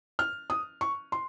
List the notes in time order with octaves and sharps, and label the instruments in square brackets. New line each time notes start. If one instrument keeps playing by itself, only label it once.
[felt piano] F6
D#6
C#6
C6